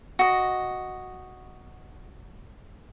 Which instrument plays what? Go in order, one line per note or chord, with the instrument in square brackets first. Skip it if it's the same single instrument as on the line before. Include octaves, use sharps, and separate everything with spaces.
[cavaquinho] F#4 D#5